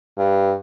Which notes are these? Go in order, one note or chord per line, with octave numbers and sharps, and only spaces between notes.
G2